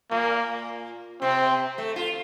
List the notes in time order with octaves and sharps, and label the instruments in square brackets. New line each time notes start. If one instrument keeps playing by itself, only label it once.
[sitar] A#2 [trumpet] A#3
[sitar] C3 [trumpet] C4
[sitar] A3
F4